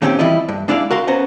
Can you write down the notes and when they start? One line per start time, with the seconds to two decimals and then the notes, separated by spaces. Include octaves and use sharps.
0.02 A#2 D#3 C4 C#4 F#4 G4
0.19 E3 G3 C4 E4 F4 D#5
0.49 G2
0.68 G#3 D4 E4 D5 F5
0.91 F#4 A#4 F5 C6
1.07 B3 C#4 C5 A#5